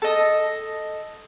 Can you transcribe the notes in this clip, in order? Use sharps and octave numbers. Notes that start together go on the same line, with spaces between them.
A4 D#5